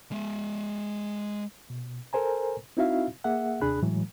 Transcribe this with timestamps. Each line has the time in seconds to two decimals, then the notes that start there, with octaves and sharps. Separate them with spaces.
0.12 G#3 E5
1.70 B2
2.13 A4 A#4 C5 G#5 A#5
2.77 C4 D#4 E4 F#4 E5 F5
3.24 A#3 G#4 E5 F#5
3.61 D#2 C3 D4 G#4 B5 F#6
3.83 A2 E3 F#3 G#3